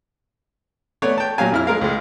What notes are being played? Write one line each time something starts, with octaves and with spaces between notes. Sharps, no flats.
A3 B3 C#5 D5
G5 A5
A#2 F#3 G4 F5 G#5
F2 E4 F6
G#3 A#4 F5
C#2 G#3